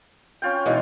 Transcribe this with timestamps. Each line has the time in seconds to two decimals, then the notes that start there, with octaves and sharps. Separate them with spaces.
0.42 C#4 F4 G5
0.66 G#2 B2 E3